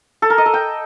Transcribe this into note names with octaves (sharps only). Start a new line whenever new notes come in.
A4
A#4
D#5
A4
G5